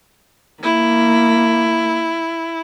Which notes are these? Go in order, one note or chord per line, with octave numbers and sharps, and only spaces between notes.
A#3 E4